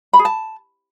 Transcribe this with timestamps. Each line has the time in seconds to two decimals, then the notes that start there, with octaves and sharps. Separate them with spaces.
0.13 B5
0.19 G#4
0.25 A5